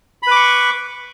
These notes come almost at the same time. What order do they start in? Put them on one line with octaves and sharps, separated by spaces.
B5 B4 D6 C#6